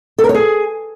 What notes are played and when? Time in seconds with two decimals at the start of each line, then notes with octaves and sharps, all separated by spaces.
0.18 A4
0.24 A#4
0.29 C#5
0.35 G#4